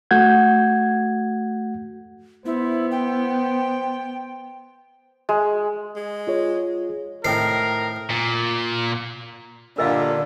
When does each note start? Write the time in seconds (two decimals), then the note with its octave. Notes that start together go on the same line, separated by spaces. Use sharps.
0.11 A3 F#4 F#5 G6 G#6
2.46 B3 E4 C5
2.91 G5
5.29 G#3
5.96 G#3
6.27 F4 G#4 C#5
7.25 A2 D#3 C4 A#4 C7
8.10 A#2
9.78 G2 A#2 D3 A#4 D#5 F5